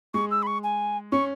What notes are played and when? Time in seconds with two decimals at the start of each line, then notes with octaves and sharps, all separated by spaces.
0.14 G#3 C#6
0.31 E6
0.43 B5
0.47 C#6
0.63 G#5
1.12 C#4 C#6